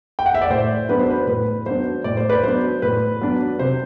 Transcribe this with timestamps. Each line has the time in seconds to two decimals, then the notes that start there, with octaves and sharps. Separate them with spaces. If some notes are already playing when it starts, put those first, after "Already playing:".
0.19 G5
0.26 F#5
0.34 E5
0.41 D5
0.50 A2 C5
0.89 F#3 B3 D4 B4
0.99 C5
1.10 B4
1.27 A2 B4
1.66 F#3 B3 D4 C5
2.04 A2 D5
2.17 C5
2.29 B4 D5
2.43 F#3 B3 D4 C5
2.82 A2 B4
3.21 F#3 B3 D4
3.59 C3 C5